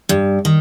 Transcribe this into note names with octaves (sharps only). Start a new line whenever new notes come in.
G2
D#3